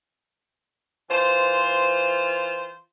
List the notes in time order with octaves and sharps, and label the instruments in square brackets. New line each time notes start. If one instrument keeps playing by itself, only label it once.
[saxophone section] E3 F4 C5